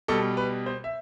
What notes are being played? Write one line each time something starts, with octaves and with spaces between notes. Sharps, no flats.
B2 G3 A4
B4
C5
E5